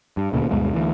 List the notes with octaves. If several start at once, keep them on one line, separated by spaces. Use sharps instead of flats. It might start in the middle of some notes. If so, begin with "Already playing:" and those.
G2
D#1 D2 A#2 C#3
D2 G2 B2 G#3
D2 E3